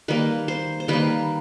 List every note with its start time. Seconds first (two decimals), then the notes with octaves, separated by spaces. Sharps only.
0.08 D#3 G3 A#3 B4
0.48 C5
0.80 C5
0.88 D#3 G3 A#3 B4